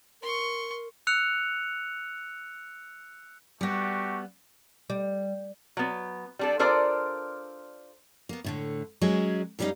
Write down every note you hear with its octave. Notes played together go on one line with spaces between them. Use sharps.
A#4 C6 C#6
E6 F#6 C#7 F7
G3 A3 B3 F#4 G4
G3
F#3 B3
G3 D4 A4
D4 F4 A4 A#4 C5 D5
A#3 B3
A2 D3 A3
F#3 G#3 C#4 G#4
F#2 F#3 G3 C#4 D#4 F5